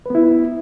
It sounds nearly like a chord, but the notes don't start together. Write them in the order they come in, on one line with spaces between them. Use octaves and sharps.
B4 B3 E4